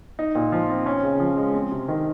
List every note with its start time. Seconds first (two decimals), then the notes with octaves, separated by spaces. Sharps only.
0.19 D#4
0.35 A#2
0.52 F3
0.69 C4
0.86 C#4
1.03 C#3
1.20 F3
1.37 G#3
1.54 C4
1.72 C3
1.88 D#3